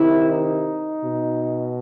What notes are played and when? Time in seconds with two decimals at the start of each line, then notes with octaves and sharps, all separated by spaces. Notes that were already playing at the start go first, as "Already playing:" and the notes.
Already playing: C3 D#3 E4
0.31 D#4
1.01 B2